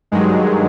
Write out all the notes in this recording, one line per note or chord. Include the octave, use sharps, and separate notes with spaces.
G2 D#3 F#3 G#3